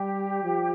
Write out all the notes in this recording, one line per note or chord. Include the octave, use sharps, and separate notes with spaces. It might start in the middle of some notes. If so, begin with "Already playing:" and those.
Already playing: G3 G4
F3